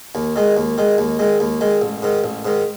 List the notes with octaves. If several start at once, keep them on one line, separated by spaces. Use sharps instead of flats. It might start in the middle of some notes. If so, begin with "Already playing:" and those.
D#2
D#3 G#3
D#2
D#3 G#3
D#2
D#3 G#3
D#2
D#3 G#3
A1
G#2 D#3
A1
G#2 D#3